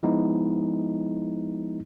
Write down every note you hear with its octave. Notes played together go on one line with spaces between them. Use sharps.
F3 G#3 B3 D#4 E4